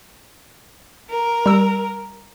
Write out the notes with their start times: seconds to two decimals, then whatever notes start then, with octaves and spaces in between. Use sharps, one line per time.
1.10 A#4
1.46 G3 E6